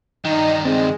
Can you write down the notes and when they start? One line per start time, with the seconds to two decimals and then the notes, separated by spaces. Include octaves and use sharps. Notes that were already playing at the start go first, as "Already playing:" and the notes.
0.25 G2 D#3 D#4
0.65 G#3 C4